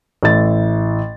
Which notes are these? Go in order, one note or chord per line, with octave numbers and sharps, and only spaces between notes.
A1 E4 A6